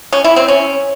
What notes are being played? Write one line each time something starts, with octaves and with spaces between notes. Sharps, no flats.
C#4
E4
C4
C#4